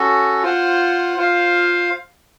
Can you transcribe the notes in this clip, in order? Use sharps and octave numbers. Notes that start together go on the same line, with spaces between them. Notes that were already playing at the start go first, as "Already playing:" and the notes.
Already playing: C#4 F#4 A4
F4 C5 F#5
F4 C5 F5